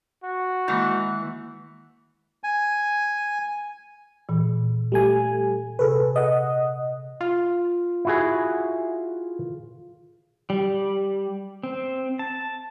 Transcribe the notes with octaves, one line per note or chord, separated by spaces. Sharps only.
F#4
D#3 E3 G#3 A#3
G#5
A#2 E3
G3 A3 G#5
C3 G#4 A4 B4
D#5 F#5
F4
E4 F#4 G#4
G3
C4
A5